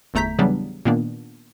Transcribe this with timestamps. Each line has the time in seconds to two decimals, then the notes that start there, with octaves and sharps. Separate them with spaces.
0.14 G1 E2 A3 A#5 G6 B6
0.39 C#3 E3 F#3 G3 B3 D4
0.85 A#2 D#3 A#3 B3 D4